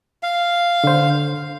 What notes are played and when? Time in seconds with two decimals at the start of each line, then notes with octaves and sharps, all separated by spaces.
0.23 F5
0.84 D3 C5